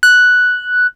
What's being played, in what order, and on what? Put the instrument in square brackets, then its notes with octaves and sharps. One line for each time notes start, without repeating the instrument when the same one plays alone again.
[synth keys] F#6